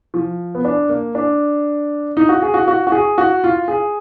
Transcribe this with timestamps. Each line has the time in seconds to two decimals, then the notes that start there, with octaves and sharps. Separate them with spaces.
0.14 F3
0.55 B3
0.65 D4
0.89 A#3
1.15 D4
2.17 D#4
2.29 F#4
2.42 G#4
2.54 F#4
2.68 F#4
2.87 F#4
2.92 G#4
3.18 F#4
3.44 F4
3.68 G#4